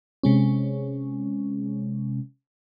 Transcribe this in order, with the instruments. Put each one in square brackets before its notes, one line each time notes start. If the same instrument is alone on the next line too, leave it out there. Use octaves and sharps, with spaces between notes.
[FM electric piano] C3 G#3 C#4